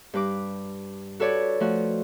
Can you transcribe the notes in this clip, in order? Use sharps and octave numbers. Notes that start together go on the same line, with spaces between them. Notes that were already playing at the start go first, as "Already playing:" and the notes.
G2 B4 D6
F#4 A4 B4 C#5 D5
F3 A3 F#4